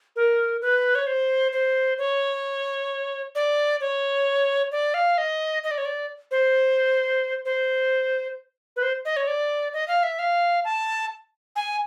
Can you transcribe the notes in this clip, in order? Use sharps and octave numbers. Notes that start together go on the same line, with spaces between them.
A#4
B4
C#5
C5
C5
C#5
D5
C#5
D5
F5
D#5
D#5
D5
C#5
D5
C5
C5
B4
C5
D#5
C#5
D5
D#5
F5
E5
F5
A5
G#5